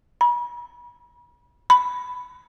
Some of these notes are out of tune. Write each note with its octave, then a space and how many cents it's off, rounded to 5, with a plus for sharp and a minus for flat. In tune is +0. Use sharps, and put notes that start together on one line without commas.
B5 -40
B5 +5